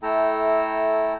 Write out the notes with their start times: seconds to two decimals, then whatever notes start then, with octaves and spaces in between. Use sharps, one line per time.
0.03 A3 E4 A4 G5 A#5 E6